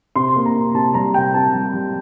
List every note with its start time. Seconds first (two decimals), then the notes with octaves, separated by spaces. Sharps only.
0.15 C3 C6
0.36 A#3
0.46 A#5
0.55 C3
0.74 C3 A5
0.94 G3 A#5
1.14 C3 G5
1.34 C3 A5
1.54 G3
1.74 G3